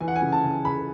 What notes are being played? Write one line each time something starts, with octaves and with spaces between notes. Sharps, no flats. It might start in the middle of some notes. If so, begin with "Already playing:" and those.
E3 G#5
F#5
G#5
C#3
A5
C#2
C#2 B5